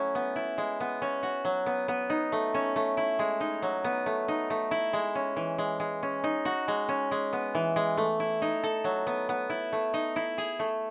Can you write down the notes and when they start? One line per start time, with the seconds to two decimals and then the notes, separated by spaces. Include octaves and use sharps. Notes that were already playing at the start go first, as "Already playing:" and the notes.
Already playing: F#3 A3 C#4 E4
0.15 B3
0.36 E4
0.58 G#3
0.80 B3
1.02 C#4
1.23 F#4
1.45 F#3
1.66 B3
1.88 B3
2.10 D#4
2.32 A3
2.54 C#4
2.76 A3
2.97 E4
3.19 G#3
3.40 D#4
3.62 F#3
3.84 B3
4.06 A3
4.28 D#4
4.50 A3
4.71 E4
4.93 G#3
5.15 C#4
5.36 E3
5.58 G#3
5.80 G#3
6.03 C#4
6.24 D#4
6.45 F#4
6.68 G#3
6.89 C#4
7.11 G#3
7.33 B3
7.55 E3
7.76 G#3
7.97 A3
8.20 E4
8.42 D#4
8.63 A4
8.84 F#3
9.07 B3
9.29 B3
9.50 E4
9.73 A3
9.94 D#4
10.16 E4
10.38 G#4
10.59 A3